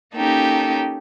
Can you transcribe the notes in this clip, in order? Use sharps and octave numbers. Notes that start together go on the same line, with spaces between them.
A#3 C#4 D#4 G4 A4